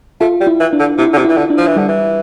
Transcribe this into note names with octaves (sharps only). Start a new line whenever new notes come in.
A3 F4
G3
E4
E3
D4
D3
C3 E4
D3
C3
E3 E4
D3
D4
F3
E3
D3 G3
E3